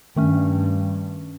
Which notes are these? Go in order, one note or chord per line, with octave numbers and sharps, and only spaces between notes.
G2 D#3 A3 C#4